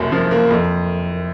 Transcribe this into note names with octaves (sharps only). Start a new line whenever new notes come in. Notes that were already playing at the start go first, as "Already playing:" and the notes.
Already playing: F#1 C2 F#2
F3
A#3
F2